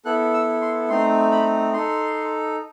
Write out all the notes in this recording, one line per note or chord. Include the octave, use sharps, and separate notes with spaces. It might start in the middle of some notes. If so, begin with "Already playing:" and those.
B3 E4 A4 F#6
E6
C6
A3 C4 D#4 C6
B5
D#4 A4 C6